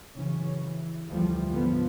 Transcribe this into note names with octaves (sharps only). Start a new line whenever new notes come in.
C#3 E3 F#3 C#4
E3
F1 D2 E3 F3 G3 A3
G#2 D3 F3 B3